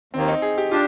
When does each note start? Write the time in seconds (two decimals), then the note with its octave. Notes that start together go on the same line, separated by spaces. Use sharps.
0.13 D#2 D#3 A#3 C4
0.28 D#4
0.42 G#4
0.58 G4
0.71 D4 F4 G4